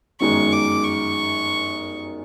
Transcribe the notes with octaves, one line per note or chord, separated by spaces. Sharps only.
G1 F#2 D#3 G#3 C#6
D6
C#6